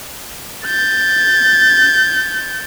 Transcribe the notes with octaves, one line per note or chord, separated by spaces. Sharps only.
G6 A6